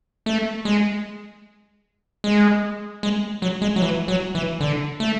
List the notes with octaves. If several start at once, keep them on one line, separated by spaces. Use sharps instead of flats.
A3
G#3
G#3
G#3
F#3
G#3
F#3
E3
F#3
E3
D3
A3